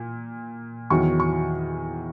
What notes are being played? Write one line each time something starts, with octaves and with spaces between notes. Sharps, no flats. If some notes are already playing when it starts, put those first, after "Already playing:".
Already playing: A#2
E2 D#3 F#3 C#6
C#6